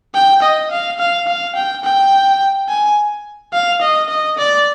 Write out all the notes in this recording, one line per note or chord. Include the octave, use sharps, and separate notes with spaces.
G5
D#5
F5
F5
F5
G5
G5
G#5
F5
D#5
D#5
D5